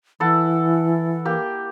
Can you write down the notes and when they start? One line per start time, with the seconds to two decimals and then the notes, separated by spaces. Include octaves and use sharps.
0.20 E3 E4 A4 F#5
1.25 A#3 G4